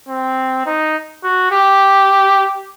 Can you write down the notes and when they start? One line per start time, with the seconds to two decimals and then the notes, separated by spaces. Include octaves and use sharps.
0.09 C4
0.66 D#4
1.24 F#4
1.51 G4